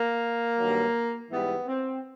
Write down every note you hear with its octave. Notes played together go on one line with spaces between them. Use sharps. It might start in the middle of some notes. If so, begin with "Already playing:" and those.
Already playing: A#3
G2 D#3 F#3
G#2 E3 G3 B3
C4